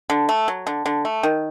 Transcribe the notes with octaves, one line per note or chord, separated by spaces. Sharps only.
D3
A3
F#3
D3
D3
A3
D#3